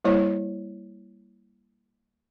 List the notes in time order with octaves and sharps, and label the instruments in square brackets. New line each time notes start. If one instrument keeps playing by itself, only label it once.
[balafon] G3 A#3 E4 C5 C#5